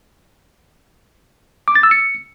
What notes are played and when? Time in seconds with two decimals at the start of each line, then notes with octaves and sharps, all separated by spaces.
1.68 D6
1.75 A6
1.83 E6
1.91 C#7